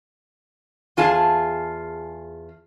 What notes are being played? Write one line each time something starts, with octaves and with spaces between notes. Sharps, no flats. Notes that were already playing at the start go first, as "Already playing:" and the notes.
E2 F4 G#4 A5